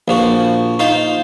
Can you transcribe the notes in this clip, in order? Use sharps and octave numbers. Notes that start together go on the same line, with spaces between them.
A#1 F3 F#4
D#4 F4 C5